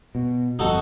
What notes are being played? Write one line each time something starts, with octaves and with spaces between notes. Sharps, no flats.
B2
G1 F2 D#4 F#4 A4